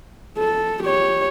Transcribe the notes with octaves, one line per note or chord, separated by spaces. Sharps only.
A4
G4 C#5